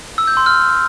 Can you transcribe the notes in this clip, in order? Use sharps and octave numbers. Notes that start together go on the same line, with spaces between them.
E6
G6
C6
F6